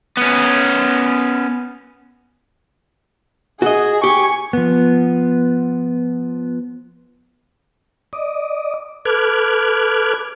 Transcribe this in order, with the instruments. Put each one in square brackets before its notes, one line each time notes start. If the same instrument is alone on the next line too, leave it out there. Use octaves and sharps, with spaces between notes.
[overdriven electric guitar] B3 C#4
[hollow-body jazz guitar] F#4 D#5 [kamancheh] G#4
[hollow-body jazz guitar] G4 [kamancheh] G#5 C#6
[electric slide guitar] F3 B3
[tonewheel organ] D5 D#5
A4 B4 D6 F6 F#6 G#6